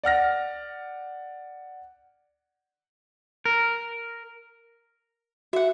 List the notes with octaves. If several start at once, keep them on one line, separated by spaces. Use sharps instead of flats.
D5 F#5 F6 A#6
A#4
F#4 E5 F#5